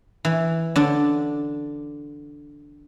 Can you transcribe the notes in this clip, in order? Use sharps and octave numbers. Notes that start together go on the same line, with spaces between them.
E3
D3 D4